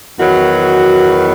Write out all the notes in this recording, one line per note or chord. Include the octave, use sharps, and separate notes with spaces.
E2 D#3 F#3 B3 F#4